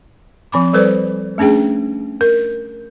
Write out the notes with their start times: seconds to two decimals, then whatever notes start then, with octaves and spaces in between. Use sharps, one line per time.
0.52 F3 C4 B5 D6
0.73 G3 A4 B4 C5 D5
1.38 A3 C#4 D4 G#4 G5
2.21 A#4